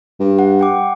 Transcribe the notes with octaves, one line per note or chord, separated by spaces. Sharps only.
G2
F#5
F#5 G5 D6